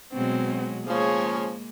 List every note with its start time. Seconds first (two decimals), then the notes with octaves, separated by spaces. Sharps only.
0.13 B2 F#3 G#3 C4
0.87 C#3 F3 G#3 A#3 G#4 C#5